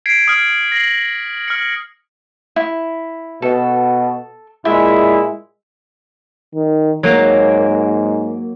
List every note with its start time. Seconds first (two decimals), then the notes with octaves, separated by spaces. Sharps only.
0.06 G#6 B6 C7 D7
0.28 D#6 F6
0.72 A#6 C7 F#7
1.48 F6 C#7
2.56 E4
3.42 B2 A4
4.65 A#2 G#3 E4 E5
6.55 D#3
7.03 G#2 F#3 A#3